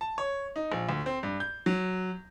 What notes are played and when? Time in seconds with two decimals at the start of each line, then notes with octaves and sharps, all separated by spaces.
0.01 A5
0.18 C#5
0.56 D#4
0.72 A#1
0.89 D2
1.06 C4
1.23 G2
1.40 G6
1.66 F#3